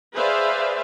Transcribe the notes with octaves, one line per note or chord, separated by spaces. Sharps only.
G#4 B4 C5 D5 E5 F5